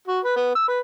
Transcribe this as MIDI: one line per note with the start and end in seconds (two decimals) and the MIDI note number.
0.08 0.19 66
0.24 0.36 71
0.36 0.52 59
0.55 0.67 88
0.68 0.79 71